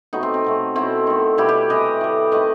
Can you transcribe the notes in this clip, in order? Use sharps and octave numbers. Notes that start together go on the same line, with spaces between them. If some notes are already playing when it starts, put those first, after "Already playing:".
C3 F#3 A3 B3 D#4
C4
C4
B2 F#3 A3
B2 F#3 A3 C4 E4
D#3 A3
B2 G3 E4 G4
G4 B4
C3 E3 G3 B4 D#5
A2 G3
C3 D#3 A3 B4 D#5